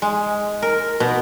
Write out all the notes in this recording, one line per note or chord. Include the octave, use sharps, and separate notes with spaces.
G#3
A#4
B2